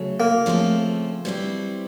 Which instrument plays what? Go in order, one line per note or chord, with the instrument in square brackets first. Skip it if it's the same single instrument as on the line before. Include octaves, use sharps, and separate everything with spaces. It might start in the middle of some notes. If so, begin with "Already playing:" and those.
Already playing: [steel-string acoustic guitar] C#3 F#3 A3
[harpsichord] A#3
[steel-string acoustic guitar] C#3 F3 A3 C4
B2 G3 C4 E4